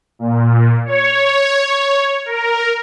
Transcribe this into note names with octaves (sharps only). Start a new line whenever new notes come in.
A#2
C#5
A#4